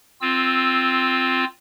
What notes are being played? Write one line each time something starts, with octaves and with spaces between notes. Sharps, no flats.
C4 F4 E6